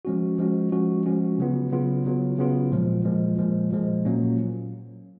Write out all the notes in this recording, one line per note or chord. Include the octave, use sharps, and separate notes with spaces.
F3 G#3 C#4 F#4
F3 G#3 C#4 F#4
F3 G#3 C#4 F#4
F3 G#3 C#4 F#4
C#3 F#3 B3 F4
C#3 F#3 B3 F4
C#3 F#3 B3 F4
C#3 F#3 B3 F4
A#2 F3 G#3
A#2 F3 G#3
A#2 F3 G#3
A#2 F3 G#3
A#2 F#3 A#3 C#4